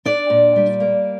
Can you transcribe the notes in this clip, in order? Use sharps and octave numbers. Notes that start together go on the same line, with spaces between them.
D4 D5
A#2
G3
A#3